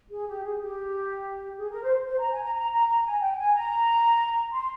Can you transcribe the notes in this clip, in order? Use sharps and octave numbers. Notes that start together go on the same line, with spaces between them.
G#4
G4
G#4
G4
G#4
A#4
C5
C5
A#5
G#5
A#5
A#5
A#5
A#5
G#5
G5
G5
G#5
A#5
C6